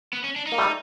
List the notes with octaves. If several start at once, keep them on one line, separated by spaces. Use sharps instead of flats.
B3
C#4
D4
D#4
A#3
G3 A3